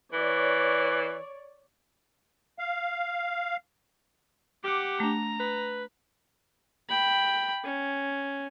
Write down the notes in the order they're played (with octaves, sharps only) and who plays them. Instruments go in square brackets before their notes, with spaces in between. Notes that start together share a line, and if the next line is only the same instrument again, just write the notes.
[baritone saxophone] E3 [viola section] C#5 D5
[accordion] F5
[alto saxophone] G4 [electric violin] F#5 D6
[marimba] A3 D4 [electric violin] A#5
[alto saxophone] B4
[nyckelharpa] G5 B5
C#4